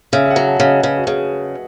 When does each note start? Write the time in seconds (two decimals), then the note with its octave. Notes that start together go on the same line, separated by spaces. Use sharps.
0.13 C#3 E5
0.25 E5
0.30 F#5
0.36 F#3
0.48 A5
0.60 C#3
0.66 D#5
0.83 C#3 B4
0.97 F#4
1.07 C#3 G#4